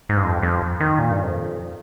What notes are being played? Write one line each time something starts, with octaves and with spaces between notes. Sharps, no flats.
G#2
G2
F2
F2
D#3
A#2
G2
F2